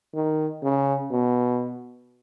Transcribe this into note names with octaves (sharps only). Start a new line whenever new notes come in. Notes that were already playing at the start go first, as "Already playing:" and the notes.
D#3
C#3
B2